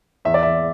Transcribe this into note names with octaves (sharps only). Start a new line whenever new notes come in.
E2 E5
D5
E2 E5